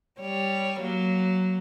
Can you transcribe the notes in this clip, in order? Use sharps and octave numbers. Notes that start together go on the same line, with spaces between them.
G3 C#5
F#3 A#3